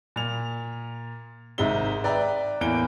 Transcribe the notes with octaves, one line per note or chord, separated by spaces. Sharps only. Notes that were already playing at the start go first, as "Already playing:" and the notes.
A#2 F7
G#1 G#2 C3 G#3 E5 G7
B4 D5 E5 G5 A#5
E2 A2 A#3 D7 G7